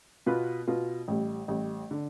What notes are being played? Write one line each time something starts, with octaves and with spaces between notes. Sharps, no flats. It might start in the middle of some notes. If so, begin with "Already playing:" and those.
B2 B3 F4 B4
B2 B3 F4 B4
A1 A2 G3
A1 A2 G3
D3